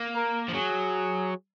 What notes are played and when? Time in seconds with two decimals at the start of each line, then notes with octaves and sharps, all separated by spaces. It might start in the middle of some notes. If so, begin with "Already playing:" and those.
Already playing: A#3
0.16 A#4
0.48 F3
0.54 F#3 G#4